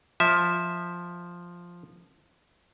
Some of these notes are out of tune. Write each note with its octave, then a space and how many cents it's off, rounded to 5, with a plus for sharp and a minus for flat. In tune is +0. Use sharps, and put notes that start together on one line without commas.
F3 +0 E5 -10